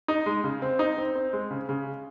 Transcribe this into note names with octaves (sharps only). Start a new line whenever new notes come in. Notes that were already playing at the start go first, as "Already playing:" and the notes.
D#4
G#3
C#3
C4
D#4
C4
C4
G#3
C#3
C#3